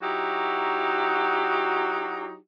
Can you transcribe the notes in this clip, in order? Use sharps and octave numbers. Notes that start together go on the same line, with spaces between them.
F#3 D#4 E4 F#4 G4